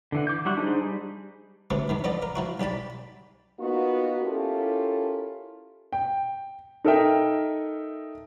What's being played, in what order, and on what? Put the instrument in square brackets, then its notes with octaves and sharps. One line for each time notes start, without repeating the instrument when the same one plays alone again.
[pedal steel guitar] D3 E3 F#5
D6 G6
F#3 G3 E4 F#5 C#6
D4 D#4 G#4 C5
G3
[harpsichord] D2 A2 C3 E3
E2 G2 D#3
F3 B3 A4 D5 D#5
A#4
F3 E4 F#4
B1 G4 D5 A5 B5
[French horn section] A#3 B3 D#4 F4 F#4
C#4 E4 F4 G4 A4 A#4
[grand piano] G5
D#4 A4 A#4 D#5 E5 G5